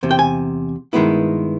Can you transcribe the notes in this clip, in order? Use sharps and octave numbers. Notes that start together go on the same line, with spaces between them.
E2 C3
G5
G#5
G2 D#3 G#3 B3 E4